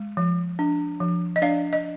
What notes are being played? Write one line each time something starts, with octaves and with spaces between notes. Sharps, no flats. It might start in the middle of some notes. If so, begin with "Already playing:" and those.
Already playing: G#3
F3
D4
F3
D#5
D4 D5 F5
D#5